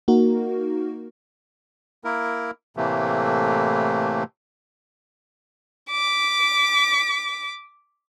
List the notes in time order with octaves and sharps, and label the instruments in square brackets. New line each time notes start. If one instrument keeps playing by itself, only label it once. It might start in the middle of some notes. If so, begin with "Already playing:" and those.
[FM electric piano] A#3 D#4 F#4 A#4
[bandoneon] A#3 E4 A#4
A2 C3 E3 A3 A#3
[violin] D6 B6